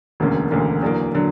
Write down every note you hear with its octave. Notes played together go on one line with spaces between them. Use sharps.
E1 D2 D3 A#3 C#4
E1 D2 D3 A#3 C#4
E2 D3 F#3 A#3
D3 F#3